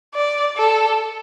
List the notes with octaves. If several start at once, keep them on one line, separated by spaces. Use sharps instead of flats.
D5
A4